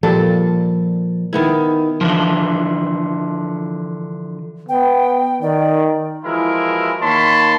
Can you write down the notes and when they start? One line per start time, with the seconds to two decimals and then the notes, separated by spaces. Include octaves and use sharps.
0.03 A#2 F3 G3 A4
1.33 D#3 B3 E4
2.01 D3 E3 F3
4.69 B3 G5
5.42 D#3 D5
6.24 E3 F3 G#3 E4 F#4 A#4
7.01 D#3 A#3 C#5 A5 B5 C6